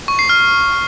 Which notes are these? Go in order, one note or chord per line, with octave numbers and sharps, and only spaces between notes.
C#6
C7
F6